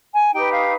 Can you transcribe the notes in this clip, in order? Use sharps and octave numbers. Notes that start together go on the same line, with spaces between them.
G#5
D#4 G4 B4 G5
F5